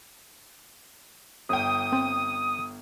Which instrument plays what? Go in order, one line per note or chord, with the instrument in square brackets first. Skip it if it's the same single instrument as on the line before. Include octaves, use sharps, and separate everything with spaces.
[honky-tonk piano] G1 G5 [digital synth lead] D#6
[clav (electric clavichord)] C4 C5